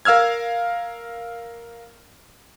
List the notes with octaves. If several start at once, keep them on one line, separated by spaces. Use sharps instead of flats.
A#4 F5 E6 F6 G#6